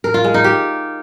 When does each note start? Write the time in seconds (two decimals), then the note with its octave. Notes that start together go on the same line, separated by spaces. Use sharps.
0.04 A#4
0.14 F4
0.24 G#3
0.34 D#4
0.44 G4